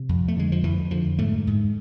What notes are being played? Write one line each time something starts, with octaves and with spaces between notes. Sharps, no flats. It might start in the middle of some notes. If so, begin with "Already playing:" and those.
Already playing: C3
F2
A3
D3 G#3
F3
F2 E3
D3 F3
G#2 A3
G#2